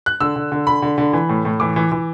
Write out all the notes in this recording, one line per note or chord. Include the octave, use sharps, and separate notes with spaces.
F#6
D3 E6
D3
D3
D3 B5
D3
D3
E3
A2
A2
E3 D6
E3
E3